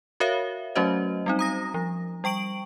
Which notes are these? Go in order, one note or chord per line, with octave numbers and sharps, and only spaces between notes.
F#4 A#4 C#5 E5 F5
F#3 A3 C#4 F#4 C5 D#5
G3 C4 D#4
A#5 D#6 A#6
F3
G3 G5 C#6 D7 F#7